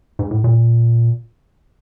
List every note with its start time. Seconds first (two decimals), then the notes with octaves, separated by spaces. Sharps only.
0.19 G#2
0.31 A2
0.44 A#2